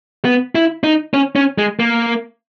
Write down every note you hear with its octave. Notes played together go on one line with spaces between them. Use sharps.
B3
E4
D#4
C#4
C#4
G#3
A#3